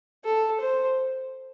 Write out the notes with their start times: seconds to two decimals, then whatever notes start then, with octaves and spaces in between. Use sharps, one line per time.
0.24 A4
0.61 C5